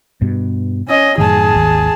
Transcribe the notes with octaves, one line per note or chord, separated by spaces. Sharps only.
G2 B2
C#4 D#5
F#2 A2 D#3 G#4 A5
G#1 D#2